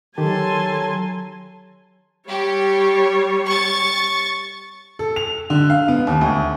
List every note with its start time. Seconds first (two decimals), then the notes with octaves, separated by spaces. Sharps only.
0.18 D#3 F#3 G4 A4 G#5 A5 C6
2.27 G3 G4 C#5
3.47 C#6 A6
4.99 A4
5.16 F7
5.50 D3
5.70 F5
5.88 B3
6.07 D#2
6.21 D2